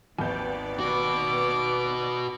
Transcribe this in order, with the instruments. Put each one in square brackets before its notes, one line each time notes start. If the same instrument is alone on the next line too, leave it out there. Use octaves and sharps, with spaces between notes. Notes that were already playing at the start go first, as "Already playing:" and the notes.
[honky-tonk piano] G#1 D#2 G6 [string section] D#3 B3 D5
[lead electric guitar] F#4 B4 [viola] D6